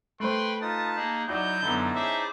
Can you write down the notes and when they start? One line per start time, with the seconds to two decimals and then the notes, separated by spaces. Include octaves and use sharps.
0.20 A3 B4 C5 G5 B5 C6
0.61 D#4 F4 B4 A5 D#6 A6
0.96 A#3 D#4 G#4
1.28 F#3 D#4 E4 F#4 D5 D#5 G6
1.62 F#2 D3 F#3 B3 D#4 E4 A5
1.95 C#4 G#4 C5 E5 D6